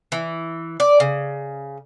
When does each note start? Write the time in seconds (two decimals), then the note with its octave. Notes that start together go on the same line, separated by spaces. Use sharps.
0.12 E3
0.80 D5
1.00 C#3